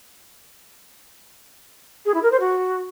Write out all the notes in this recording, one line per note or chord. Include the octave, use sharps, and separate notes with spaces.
G#4
E4
A#4
C5
F#4